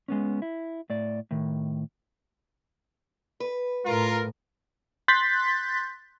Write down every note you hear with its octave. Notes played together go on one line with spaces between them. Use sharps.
G#3 B3 C#4
E4
A2 D5
A2 D#3
B4
A2 F4 A#4
C6 F#6 G6 A6 B6